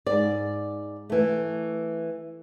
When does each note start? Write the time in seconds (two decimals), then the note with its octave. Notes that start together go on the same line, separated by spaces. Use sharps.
0.06 G#2 D5
1.10 E3 A3